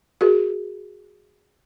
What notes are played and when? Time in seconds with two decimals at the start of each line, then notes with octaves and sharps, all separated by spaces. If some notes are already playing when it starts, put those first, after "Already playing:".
0.21 F#4 G#4 A#4